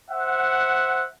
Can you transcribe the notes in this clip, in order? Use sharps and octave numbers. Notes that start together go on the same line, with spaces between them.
C5 E5 F#5